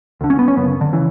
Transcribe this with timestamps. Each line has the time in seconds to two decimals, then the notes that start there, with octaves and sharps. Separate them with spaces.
0.21 D2 D3
0.30 C#4
0.39 B3
0.48 C#4
0.57 F#2 C#3 B3
0.81 D3
0.93 C#3 E3